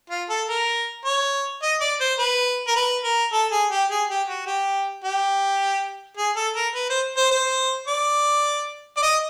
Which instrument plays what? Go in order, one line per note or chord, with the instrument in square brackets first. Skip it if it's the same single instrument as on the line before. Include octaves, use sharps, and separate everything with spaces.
[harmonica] F4
A4
A#4
C#5
D#5
D5
C5
B4
A#4
B4
A#4
A4
G#4
G4
G#4
G4
F#4
G4
G4
G#4
A4
A#4
B4
C5
C5
C5
D5
D5
D#5